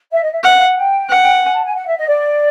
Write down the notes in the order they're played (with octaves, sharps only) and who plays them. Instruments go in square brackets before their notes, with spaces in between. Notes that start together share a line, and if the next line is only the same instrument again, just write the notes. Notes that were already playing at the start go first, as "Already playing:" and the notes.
[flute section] E5
D#5
E5
[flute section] E5 [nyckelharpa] F#5
[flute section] F5
F#5
G5
[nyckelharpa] F#5
[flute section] G#5
A5
G#5
F#5
E5
D#5
D5